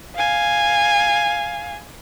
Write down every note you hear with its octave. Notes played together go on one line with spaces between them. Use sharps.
F5 G#5